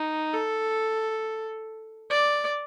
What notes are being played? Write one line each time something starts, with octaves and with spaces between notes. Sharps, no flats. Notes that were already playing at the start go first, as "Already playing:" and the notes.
Already playing: D#4
A4
D5